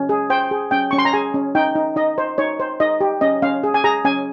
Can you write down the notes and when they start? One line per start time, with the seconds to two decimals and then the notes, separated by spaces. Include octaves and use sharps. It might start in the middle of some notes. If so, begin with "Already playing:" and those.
Already playing: C#4
0.09 G#4
0.30 C5 G5
0.51 G#4
0.71 C#4 G5
0.91 C#4 C#6
0.98 C6
1.05 A#5
1.13 G#4 G#5
1.34 C#4
1.55 D#4 G5
1.76 D#4
1.96 D#4 D#5
2.18 C5
2.38 D#4 C#5
2.60 C5
2.80 D#4 D#5
3.01 G4
3.21 C#4 D#5
3.42 C#4 F5
3.64 G#4
3.74 G#5
3.84 G#4 A#5
4.05 C#4 G#5